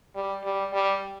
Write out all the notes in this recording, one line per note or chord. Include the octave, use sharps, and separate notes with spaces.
G3
G3
G3